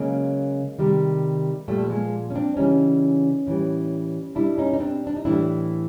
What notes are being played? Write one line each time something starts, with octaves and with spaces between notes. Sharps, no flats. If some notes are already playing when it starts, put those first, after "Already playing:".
Already playing: C#3 F#3 G#3 A#3
C3 D#3 G3
A#2 F3 G3 A3
B3
G#3 A#3
C#4
C4 D4
C#3 E3 G3 C#4 D#4
A2 E3 G3
B2 G3 D4 E4
C#4 D#4
D#4
C4 D4
D4
D#4
A2 E3 G3 D4 E4